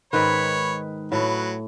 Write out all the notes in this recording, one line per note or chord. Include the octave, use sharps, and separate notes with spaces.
G#2 D#3 B4 C#5 B5
A2 F#3 B4